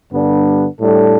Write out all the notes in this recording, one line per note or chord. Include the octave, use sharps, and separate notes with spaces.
G2 D3 G3 B3 D4
A2 G3 D4 A4